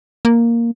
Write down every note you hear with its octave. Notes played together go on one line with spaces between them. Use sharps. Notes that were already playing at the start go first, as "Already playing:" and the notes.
A#3